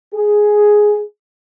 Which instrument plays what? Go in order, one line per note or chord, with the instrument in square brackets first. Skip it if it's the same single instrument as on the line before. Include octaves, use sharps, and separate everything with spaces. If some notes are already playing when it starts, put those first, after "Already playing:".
[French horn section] G#4